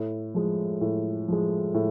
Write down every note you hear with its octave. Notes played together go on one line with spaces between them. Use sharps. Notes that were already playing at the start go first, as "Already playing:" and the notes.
Already playing: A2
F3 G#3
A2
F3 G#3
A2